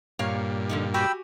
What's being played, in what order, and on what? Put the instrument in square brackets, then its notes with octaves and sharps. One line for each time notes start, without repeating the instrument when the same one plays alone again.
[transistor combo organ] G2 A#2 [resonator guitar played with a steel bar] A#3 C#5 F5
[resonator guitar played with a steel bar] D3 F3 D#4
[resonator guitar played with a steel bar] F#4 G4 G#5 [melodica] G5 B5 E6